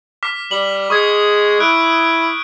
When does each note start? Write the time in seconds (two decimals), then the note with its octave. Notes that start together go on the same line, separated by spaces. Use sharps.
0.23 D6 F6 B6
0.51 G3 F#7
0.90 G#3 C#6 D#6 G#6
1.60 E4 F6 F#6 D7